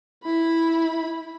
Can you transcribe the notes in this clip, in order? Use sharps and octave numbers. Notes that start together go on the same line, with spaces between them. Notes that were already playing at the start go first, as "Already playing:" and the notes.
E4 B5